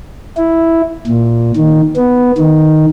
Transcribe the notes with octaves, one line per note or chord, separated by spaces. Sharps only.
E4
A#2
D#3
B3
D#3